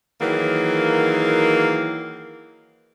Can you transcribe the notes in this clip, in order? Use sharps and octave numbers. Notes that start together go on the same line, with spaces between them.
D#3 E3 F#3 A#3 G#4 A#4